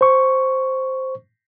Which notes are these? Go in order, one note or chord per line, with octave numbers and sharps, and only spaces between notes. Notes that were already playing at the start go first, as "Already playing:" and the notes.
C5 C#6